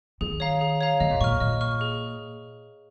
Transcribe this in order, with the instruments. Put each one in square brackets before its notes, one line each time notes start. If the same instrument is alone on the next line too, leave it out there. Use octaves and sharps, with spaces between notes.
[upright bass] D#3 [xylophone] G#4
[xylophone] C#5 F5 A#5
G#4
C#5 F5 A#5
[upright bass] C#3 [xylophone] D#5
[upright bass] A#2
[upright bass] A#2 [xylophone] C#6 F6
[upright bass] A#2 [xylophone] D#5
[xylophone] C#6 F6
G#4